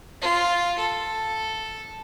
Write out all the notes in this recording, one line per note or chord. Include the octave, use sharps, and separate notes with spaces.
F4
A4